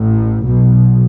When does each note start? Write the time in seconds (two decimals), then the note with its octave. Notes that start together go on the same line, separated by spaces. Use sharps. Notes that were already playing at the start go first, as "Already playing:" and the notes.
Already playing: A1 A2
0.45 B1 B2